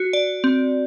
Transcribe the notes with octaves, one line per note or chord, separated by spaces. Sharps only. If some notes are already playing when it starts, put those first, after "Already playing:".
Already playing: F#4
D5
C4